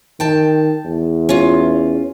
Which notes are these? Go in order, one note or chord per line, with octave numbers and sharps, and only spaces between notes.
D#3 G5 A5
E2
C#4 F4